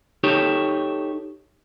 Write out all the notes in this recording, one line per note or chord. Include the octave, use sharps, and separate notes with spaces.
D#4 G4 A4 C#5